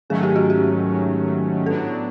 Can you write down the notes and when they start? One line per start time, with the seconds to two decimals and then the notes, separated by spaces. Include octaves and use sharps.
0.10 G#2 D#3 F#3 A3 C#4 G#4
0.23 G4
0.36 F#4
0.50 G4
1.66 A2 F#3 B3 D4 A4